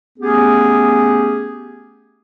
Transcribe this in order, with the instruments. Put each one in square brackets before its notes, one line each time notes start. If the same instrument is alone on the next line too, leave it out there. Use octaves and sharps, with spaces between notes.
[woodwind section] A3 B3 C#4 G4 G#4